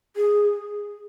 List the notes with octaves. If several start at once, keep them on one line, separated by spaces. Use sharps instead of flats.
G#4